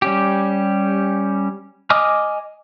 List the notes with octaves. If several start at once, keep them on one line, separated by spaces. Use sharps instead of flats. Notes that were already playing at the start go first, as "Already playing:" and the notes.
G3 C#4 G4
D#5 G#5 D6 D#6 F6